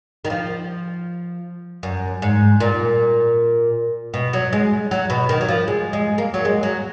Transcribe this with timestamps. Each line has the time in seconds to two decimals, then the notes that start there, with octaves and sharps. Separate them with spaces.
0.25 D#3
0.30 F3
1.83 F#2
2.22 G#2
2.60 A#2
4.14 B2
4.33 F#3
4.53 G#3
4.91 F#3
5.10 B2
5.29 D#3
5.41 F#3
5.48 F3
5.68 G#3
5.93 G#3
6.18 A#3
6.34 F#3
6.45 G#3
6.63 F#3